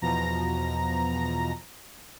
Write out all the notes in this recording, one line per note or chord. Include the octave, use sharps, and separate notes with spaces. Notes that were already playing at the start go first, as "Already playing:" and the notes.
E2 B2 F3 A#5 A#6